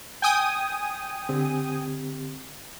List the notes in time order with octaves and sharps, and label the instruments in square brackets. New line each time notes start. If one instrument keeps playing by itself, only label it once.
[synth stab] G5 G#5 D#6
[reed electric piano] D3 C4 G4